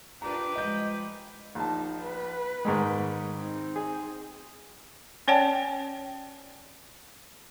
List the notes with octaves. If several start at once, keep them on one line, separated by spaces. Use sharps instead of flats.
D4 F4 G4 A#4 B4 A#5
F3 G3 G#3 D#5 G6
A#1 D#4 A5
B4
G#2 D#3 G#3
C4 D#4
G#4
C#4 C#5 D5 G5 A5